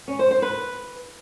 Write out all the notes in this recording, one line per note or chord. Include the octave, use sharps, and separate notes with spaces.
C#4
C5
C5
B4